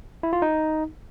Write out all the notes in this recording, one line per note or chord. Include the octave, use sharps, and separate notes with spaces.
E4
F4
D#4